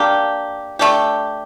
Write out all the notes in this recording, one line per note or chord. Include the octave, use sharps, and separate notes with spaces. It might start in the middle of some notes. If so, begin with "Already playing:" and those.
Already playing: A#3 D4 G4
A3 D4 G4